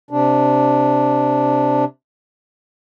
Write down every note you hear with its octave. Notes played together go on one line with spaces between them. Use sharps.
C3 D4